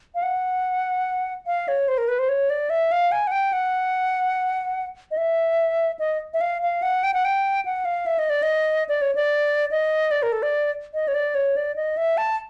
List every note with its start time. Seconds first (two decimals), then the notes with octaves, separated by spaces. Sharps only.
0.15 F5
0.23 F#5
1.47 F5
1.68 C#5
1.88 C5
1.98 A#4
2.08 B4
2.19 C5
2.29 C#5
2.50 D5
2.70 E5
2.92 F5
3.12 G#5
3.27 F#5
3.32 G5
3.53 F#5
5.11 D#5
5.17 E5
5.99 D#5
6.34 E5
6.41 F5
6.62 F5
6.82 F#5
7.03 G5
7.14 F#5
7.25 G5
7.65 F#5
7.85 F5
8.06 E5
8.19 D#5
8.30 D5
8.43 D#5
8.89 D5
9.02 C#5
9.15 D5
9.71 D#5
10.11 D5
10.23 A#4
10.32 A4
10.43 D5
10.94 D#5
11.08 C#5
11.14 D5
11.35 C#5
11.56 D5
11.76 D#5
11.97 E5
12.18 A5